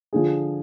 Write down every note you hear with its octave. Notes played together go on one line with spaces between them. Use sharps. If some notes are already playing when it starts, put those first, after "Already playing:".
D3 F3 G#4